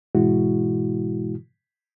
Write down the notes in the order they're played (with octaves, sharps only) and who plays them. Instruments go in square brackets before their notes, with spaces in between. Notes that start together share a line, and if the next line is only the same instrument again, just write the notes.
[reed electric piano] G#2 B2 E3 G#3 E4 F#4